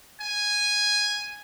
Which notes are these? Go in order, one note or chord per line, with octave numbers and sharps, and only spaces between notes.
G#5